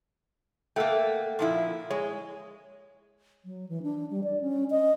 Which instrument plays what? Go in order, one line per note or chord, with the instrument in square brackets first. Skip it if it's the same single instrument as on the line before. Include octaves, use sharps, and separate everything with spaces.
[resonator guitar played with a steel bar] A3 A#3 [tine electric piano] A4 F#5 G5
[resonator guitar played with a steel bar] A#2 F3 E4
[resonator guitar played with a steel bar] G#3 [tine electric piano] C#5
[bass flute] F#3
E3
D4
G3
D5
C#4
D#5